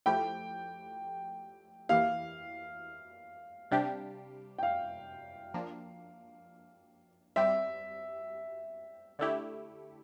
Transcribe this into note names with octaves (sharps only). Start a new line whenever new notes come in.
F3 A3 E4 G4 G5
E3 A#3 E4 G4 F5
C3 G3 D4 G4
G5
F5
F3 A#3 D4
G3 C4 G4 E5
D3 A3 E4 G4